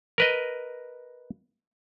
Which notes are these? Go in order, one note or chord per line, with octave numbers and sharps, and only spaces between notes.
A#4 B4 D#5